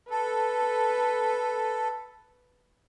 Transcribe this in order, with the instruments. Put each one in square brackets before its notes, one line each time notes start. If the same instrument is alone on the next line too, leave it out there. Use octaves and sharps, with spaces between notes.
[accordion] A4 [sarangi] B4